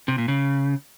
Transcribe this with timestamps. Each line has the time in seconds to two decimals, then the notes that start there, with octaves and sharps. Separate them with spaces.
0.08 C3
0.18 A#2
0.28 C#3